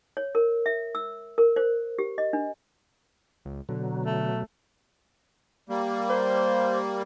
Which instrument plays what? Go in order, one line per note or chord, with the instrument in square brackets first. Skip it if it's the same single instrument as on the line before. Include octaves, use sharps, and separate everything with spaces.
[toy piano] C#5
A#4
E5
E6
A#4
C5
G4
D#5
D4
[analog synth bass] C#2
[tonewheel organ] B2 F#3 [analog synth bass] D3
[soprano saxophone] A3
[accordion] G3 A#3
[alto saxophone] C5